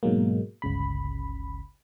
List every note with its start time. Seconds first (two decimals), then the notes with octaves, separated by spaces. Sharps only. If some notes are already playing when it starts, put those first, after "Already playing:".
0.03 G#2 B2 F#3 G#3 A#3
0.62 G1 C#2 C#3 B5